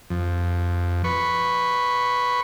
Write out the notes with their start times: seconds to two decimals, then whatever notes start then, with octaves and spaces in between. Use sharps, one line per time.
0.10 F2
1.04 B4 C#6